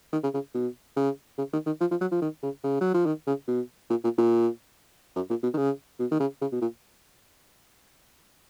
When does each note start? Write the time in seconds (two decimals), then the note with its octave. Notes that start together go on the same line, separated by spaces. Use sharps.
0.13 D#3
0.23 C#3
0.34 C#3
0.54 B2
0.97 C#3
1.38 C#3
1.53 D#3
1.66 D#3
1.81 F3
1.91 F3
2.01 F#3
2.12 F3
2.22 D#3
2.43 C#3
2.64 C#3
2.81 F#3
2.94 F3
3.06 D#3
3.27 C#3
3.48 B2
3.90 A#2
4.04 A#2
4.18 A#2
5.16 F#2
5.30 A#2
5.43 B2
5.54 D#3
5.57 C#3
5.99 B2
6.11 D#3
6.20 C#3
6.41 C#3
6.52 B2
6.61 A#2